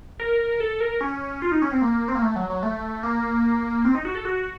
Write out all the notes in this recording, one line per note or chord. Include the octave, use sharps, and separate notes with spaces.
A#4
A4
A#4
C#4
F4
D#4
C#4
C4
A#3
C4
A#3
A3
F#3
F#3
A3
A#3
C4
D#4
F#4
A4
F#4